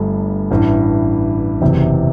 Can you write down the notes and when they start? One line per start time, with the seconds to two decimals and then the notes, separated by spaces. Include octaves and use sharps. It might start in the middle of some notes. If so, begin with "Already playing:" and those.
Already playing: G1 G2 D3 A3
0.51 A1 G2 E3
1.61 F#1 E2 C3 E3